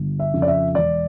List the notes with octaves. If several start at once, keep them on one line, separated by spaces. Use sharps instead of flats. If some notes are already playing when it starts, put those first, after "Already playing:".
Already playing: G1
E5
F2 C#3 F3
D5
E5
E1 D5